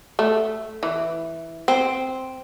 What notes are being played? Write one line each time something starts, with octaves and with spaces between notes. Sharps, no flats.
A3
E3
C4